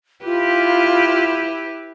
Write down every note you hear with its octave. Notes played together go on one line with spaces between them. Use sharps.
E4 F4 G4 B4